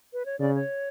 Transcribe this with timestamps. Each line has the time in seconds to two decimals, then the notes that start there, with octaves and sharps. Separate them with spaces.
0.13 B4
0.26 C#5
0.39 C#3 D5
0.55 C#5